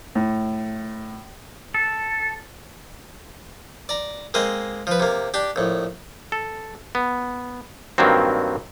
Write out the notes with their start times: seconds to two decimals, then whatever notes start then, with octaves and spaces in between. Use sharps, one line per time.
0.15 A2
1.75 A4
3.89 D5 A#5
4.34 G#3 A#3 C4 D#5
4.87 F3 B4
5.00 C3 A#3
5.34 D4 G4
5.56 A#1 A2
6.32 A4
6.95 B3
7.98 G2 D#3 F#3 A#3 C4